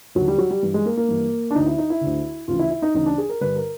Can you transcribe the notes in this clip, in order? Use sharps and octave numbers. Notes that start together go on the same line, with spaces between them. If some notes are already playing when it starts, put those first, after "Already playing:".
D#2 D3 F#3
G3
F#3
G3
G2 E3
G#3
A#3
A#3
G2 E3
D4
D2 D3 D#4
E4
D#4
E4
D2 D3
D2 C#3 E3 F4
E4
E4
D#4
D2 C#3 E3 D#4
D4
G#4
A#4
G2 D3 B4
A#4